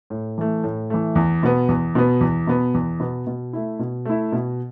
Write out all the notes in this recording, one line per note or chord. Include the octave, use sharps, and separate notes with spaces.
A2
E3 A3
A2
E3 A3
E2
B2 B3
E2
B2 B3
E2
B2 B3
E2
B2 B3
B2
A3 E4
B2
A3 E4
B2